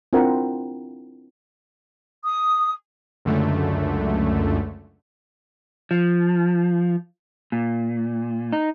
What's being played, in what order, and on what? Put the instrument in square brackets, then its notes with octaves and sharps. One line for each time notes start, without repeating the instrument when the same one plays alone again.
[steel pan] C4 D4 E4 F4 A#4 F#5
[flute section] D#6
[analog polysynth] C#2 F#2 D3 A3
[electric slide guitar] F3
A#2
D#4